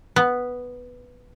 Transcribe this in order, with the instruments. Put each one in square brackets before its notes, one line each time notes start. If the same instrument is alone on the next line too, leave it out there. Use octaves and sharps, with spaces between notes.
[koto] B3